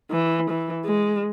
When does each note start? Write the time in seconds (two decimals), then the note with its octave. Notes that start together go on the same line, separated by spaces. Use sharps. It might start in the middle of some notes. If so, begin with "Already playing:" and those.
0.11 E3
0.50 E3
0.85 G#3